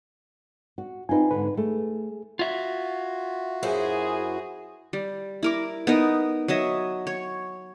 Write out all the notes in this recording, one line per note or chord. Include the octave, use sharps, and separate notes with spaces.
F#4
C4 D#4 F4 B4 G#5
G#2 D3 B4
A3 G#4
F4 F#4 E5
F#2 E4 G#4 C5
G3
E4 A#4 D6
B3 D#4 A#4
F#3 C#5 D#5 E5
C#5